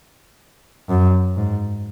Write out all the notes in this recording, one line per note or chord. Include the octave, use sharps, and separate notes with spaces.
F#2
G#2